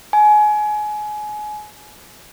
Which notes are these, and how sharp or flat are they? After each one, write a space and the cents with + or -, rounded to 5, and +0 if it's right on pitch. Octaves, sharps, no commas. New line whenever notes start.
G#5 +25